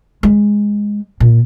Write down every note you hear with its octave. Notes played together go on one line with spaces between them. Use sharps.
G#3
A#2